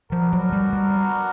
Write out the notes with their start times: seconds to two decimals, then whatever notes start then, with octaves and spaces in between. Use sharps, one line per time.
0.12 F3 B3 D4 F#4 A#4
0.33 F#3
0.53 G3
0.73 G3